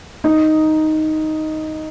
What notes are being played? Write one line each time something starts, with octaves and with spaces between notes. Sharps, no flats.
D#4